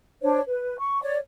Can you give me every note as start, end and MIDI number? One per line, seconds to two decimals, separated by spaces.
0.21 0.39 62
0.21 0.39 72
0.21 0.39 73
0.47 0.76 71
0.79 0.99 85
1.02 1.17 73
1.02 1.17 74